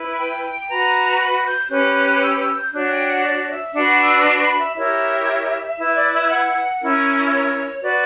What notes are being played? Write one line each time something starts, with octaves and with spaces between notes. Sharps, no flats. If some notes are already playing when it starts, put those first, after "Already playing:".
Already playing: E4 B4
G5
F#4 B4 A#5
B5
G6
C#4 G4 B4 F#6
E6
E6
G6
D4 F#4 C#5 F#6
G5
F#5
D5
E5
D4 F#4 B4 F#5
E6
C#6
B5
E5
E4 G4 A#4 C#5 E5
E4 B4 E5
D5
E5
F#5
C#4 E4 A#4
C#5
F#4 B4 D5